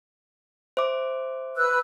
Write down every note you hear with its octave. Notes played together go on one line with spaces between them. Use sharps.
C5 E5 D6
B4 E6 F#6